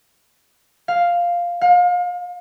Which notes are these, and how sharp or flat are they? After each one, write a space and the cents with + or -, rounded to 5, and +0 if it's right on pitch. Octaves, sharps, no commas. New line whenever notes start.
F5 +0
F5 +35